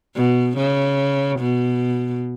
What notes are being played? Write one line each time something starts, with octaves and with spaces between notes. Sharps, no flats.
B2
C#3
B2